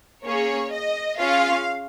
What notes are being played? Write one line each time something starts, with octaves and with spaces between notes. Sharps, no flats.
A#3 C#4 G#4 C#5
D#5
C#4 F4 G#4 F5